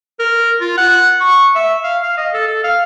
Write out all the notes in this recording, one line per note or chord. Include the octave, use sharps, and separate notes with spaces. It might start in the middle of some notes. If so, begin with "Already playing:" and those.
A#4
F4
F#5
C#6
E5
F5
F5
D#5
A4
A4
F5